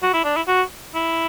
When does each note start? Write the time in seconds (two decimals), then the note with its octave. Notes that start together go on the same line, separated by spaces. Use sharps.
0.03 F#4
0.13 E4
0.24 D4
0.36 E4
0.48 F#4
0.95 E4